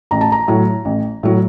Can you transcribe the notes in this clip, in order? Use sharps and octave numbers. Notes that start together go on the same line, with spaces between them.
A1 A#5
A5
A#5
A2 F#3
A1
A2 F#3